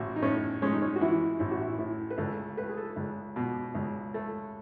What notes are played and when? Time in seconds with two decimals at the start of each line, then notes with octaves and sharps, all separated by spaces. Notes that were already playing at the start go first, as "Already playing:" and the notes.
Already playing: A1 F#4
0.16 D#4
0.22 A2 C#4
0.62 G#3 C#4
0.73 D#4
0.82 C#4
0.96 F#4
1.01 E3 E4
1.39 A1 E4
1.51 F#4
1.61 E4
1.78 A2 E4
2.10 B4
2.18 C#2 A4
2.57 A3 B4
2.69 G#4
2.77 A4
2.96 C#2
3.36 B2
3.75 C#2
4.14 A3